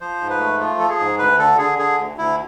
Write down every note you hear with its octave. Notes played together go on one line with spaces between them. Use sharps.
F3 C5
G#2
B4
A3
F3 F4
F3 A4
G#4
G#2
D2 B4
D3 A4
D3 G#4
D3 G#4
D2
D2 E4